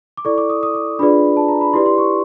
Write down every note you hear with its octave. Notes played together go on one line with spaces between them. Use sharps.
D6
E4 A4 D5 C#6
D6
D#6
D#6
D6
D4 F4 G#4 B4 D5 B5
A5
A#5
B5
E4 G4 B4 D5 C6
C6
C#6